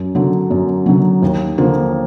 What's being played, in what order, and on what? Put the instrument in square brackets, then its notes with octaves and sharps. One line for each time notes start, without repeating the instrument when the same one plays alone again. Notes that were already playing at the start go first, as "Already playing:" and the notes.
Already playing: [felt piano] F#2
D3 F#3
F#2
D3 F#3
D#2
D3 F3 A#3